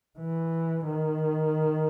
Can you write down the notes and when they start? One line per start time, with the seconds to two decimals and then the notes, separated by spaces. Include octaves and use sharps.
0.19 E3
0.86 D#3